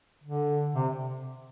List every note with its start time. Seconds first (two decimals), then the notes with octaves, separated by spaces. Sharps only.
0.23 D3
0.75 C3